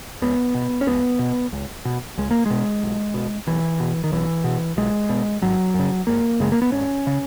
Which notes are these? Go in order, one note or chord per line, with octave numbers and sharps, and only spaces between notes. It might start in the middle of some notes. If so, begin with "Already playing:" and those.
C#2 B3
B2
C#4
C#2 B3
B2
C#2
B2
C#2 G#3
A#3
B2 G#3
B1
B2
B1 E3
B2
D#3
B1 E3
B2
B1 G#3
B2
G#1 F#3
F#2 C#3
G#1 A#3
F#2 C#3 G#3
A#3
B3
G#1 C#4
C#3